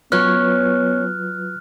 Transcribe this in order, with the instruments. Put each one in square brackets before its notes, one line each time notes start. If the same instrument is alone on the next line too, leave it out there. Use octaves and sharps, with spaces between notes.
[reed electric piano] F#3 F4 B4 [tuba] B3 [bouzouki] C#4 C#5 [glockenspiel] F6 F#6